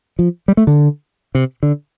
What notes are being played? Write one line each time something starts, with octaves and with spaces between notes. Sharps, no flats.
F3
G3
A3
D3
C3
D3